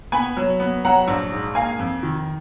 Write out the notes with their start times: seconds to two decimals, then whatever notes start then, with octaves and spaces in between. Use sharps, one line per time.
0.12 B3 G#5 B5
0.37 F#3
0.60 B3
0.85 F#3 F#5 A#5
1.08 A#1
1.32 G#2
1.55 A#3 F5 G#5
1.79 F2
2.03 D#3